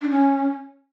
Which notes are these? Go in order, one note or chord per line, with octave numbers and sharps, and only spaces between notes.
D4
C#4